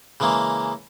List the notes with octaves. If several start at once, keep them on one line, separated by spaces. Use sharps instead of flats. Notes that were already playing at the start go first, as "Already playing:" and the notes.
C#3 E3 G#3 A#3